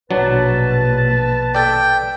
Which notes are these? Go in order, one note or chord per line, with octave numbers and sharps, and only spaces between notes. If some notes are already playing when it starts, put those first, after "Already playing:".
A#1 B2 F#3 D4 B4 A5
A4 D5 G5